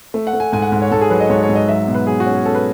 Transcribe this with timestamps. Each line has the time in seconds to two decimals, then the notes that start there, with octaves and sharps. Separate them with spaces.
0.14 A3
0.27 F#5
0.33 A3
0.40 G#5
0.53 G#2 G#5
0.62 F#5
0.72 G#2
0.82 C#5
0.91 G#2 A4
1.01 G#4
1.10 F#3 B4
1.20 D#5
1.30 G#2 C#5
1.43 C#5
1.49 G#2
1.55 D#5
1.69 F#3 E5
1.87 B2
1.95 B4
2.07 F#3 G#4
2.20 F#4
2.26 C#4
2.33 G#4
2.45 C#4 A4
2.55 B4